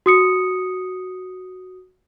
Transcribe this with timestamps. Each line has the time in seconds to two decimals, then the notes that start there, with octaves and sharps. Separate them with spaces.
0.06 F#4 D#6 C#7